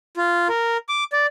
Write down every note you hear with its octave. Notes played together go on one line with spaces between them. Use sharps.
F4
A#4
D6
D5